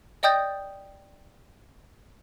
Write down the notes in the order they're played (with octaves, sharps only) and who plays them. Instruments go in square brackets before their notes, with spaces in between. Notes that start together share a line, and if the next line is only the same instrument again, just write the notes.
[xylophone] D5 D#5 G5 D#6 G6 A6